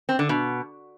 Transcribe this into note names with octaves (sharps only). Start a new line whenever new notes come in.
C4
D3
B2